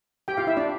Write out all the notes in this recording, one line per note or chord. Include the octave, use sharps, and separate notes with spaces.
G4 G5
F4 F5
E4 E5
D4 D5